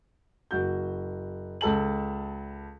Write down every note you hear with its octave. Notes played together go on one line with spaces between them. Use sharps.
F#1 F#4 G6
C#2 A4 A5 F#7